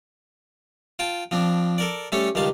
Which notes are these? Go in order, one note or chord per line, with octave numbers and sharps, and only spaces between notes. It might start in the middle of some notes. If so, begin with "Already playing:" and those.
F4 G5 A5
F3 C4 D4
A4 A#4 D5
G3 A3 C#4 A4 C#5
C#2 D#3 G3 F5 A5